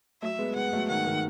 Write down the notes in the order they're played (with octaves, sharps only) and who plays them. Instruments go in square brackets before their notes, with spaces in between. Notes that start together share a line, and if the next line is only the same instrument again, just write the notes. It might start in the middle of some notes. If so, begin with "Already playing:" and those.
[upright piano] F#3 A3 [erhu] E5
[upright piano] G#3 B3
[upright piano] G#3 B3 [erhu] F#5
[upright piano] F#3 A3
[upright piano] D#3 [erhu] F#5
[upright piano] D#3